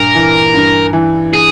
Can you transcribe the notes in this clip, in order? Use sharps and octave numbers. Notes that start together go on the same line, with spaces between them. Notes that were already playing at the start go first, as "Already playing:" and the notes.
Already playing: G2 A#2 A#4
E3
G2
E3
G#4